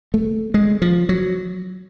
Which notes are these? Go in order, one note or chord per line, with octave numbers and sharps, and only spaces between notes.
A3
G#3
F3
F#3